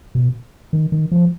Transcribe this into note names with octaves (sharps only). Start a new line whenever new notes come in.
B2
D#3
D#3
F3